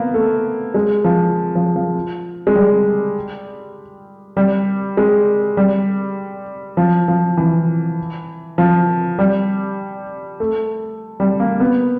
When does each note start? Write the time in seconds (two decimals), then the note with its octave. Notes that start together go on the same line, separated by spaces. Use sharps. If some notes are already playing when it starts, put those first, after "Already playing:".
Already playing: A#3 B3
0.14 A3
0.74 G#3
1.04 F3
1.55 F3
1.76 F3
2.47 G#3
2.56 G3
4.37 G3
4.97 G#3
5.57 G3
6.77 F3
7.08 F3
7.37 E3
8.58 F3
9.19 G3
10.40 A3
11.20 G3
11.40 A#3
11.60 B3